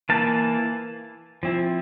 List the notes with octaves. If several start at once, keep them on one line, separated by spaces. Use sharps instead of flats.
E3 A#3 E4 F5 A5
F3 C4 E4